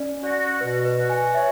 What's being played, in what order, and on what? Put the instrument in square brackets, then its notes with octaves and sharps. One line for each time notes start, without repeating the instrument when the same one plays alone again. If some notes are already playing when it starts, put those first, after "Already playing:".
Already playing: [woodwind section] C#4 [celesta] D5
[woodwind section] F#4 [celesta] D5
[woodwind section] B2 [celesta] B4
[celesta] B4
[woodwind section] F#4
[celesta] G#5
[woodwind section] C#5 [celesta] E5